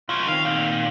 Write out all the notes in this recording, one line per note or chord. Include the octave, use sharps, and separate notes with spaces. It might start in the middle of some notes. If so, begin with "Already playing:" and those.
B1 C#3 F4
D#3 C4 F5
A#2